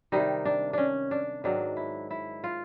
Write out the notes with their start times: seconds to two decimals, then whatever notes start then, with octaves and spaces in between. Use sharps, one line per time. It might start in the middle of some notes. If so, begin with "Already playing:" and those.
0.12 C3 D#3 G3 D#4
0.45 D4
0.73 C#4 D4
1.11 D4
1.44 G#2 D#3 F#3 D4
1.77 E4
2.11 E4
2.44 F4